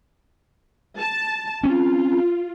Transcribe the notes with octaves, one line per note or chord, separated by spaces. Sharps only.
A5
C4 C#4 F4